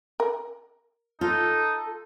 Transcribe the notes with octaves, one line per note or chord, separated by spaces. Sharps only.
A#4
D#4 F4 A4